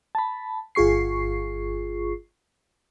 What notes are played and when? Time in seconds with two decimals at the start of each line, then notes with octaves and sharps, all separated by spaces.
0.15 A5 B5
0.75 G1 F4 G#4 C#6 C7